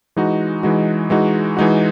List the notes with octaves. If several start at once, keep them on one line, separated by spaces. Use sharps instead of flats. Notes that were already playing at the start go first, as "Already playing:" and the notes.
E3 G#3 D#4 F#4
E3 G#3 D#4 F#4
E3 G#3 D#4 F#4
E3 G#3 D#4 F#4